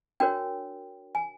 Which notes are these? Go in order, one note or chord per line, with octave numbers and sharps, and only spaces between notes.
D4 F#4 A#4 C#5 G5
G#5